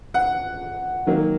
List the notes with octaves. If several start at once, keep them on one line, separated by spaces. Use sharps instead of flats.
F#5
D#3 F#3 A#3